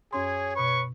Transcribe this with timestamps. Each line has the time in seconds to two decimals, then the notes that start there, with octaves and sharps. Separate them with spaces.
0.13 F#2 C#4 G#4 C#5 C6
0.56 B2 B4 B5 C#6